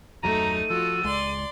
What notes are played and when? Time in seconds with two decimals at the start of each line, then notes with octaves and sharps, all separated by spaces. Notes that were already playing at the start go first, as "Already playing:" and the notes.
0.23 D#1 F#2 F#3 A3 D#4 A#5 D#7
0.70 F3 F4 F#4 A4
1.05 C#2 G#3 D5 C6